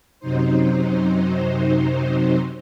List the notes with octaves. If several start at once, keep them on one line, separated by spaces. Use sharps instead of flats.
F#2 C3 F#3 D#4 C5